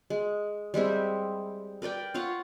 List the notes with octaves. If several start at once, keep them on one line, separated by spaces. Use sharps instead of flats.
G#3
G3 G#3 C4 E4
A#4 B4 D5 G5
F4 C#5 F5 F#5